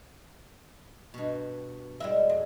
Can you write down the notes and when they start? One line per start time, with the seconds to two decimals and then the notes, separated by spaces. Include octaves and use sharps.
1.14 G2 B2
2.00 G3 G#3 E4 E5
2.30 F2